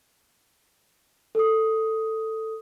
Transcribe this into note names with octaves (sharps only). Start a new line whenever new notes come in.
A4 D#6